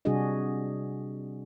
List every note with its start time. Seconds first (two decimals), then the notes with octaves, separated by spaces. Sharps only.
0.05 C3 G3 D4 F#4 G#4 D#5